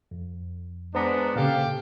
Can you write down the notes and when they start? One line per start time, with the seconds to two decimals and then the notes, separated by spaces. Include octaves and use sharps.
0.11 F2
0.95 G#3 B3 D4 C5 A#5
1.36 A#2 C#3 G4 A4 F5